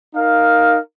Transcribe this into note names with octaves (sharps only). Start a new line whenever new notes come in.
D#4 A#4 F5